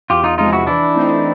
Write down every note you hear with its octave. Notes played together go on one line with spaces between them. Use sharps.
E2 F4 G4
D#4 F4
C3 F3 G#3 D#4 F4
E4 F#4
E3 D4 E4
A3 C4 D#4